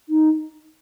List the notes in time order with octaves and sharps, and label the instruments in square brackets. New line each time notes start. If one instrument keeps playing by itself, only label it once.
[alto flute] D#4